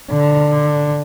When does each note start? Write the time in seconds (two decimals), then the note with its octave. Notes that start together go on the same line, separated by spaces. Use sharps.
0.11 D3